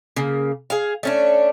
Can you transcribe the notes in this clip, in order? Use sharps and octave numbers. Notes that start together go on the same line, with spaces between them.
C#3 A#3
G#4 F5
A3 C#4 D4